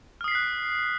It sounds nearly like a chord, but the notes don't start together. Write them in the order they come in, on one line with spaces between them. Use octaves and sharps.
F6 D#6 C7 B6 F#6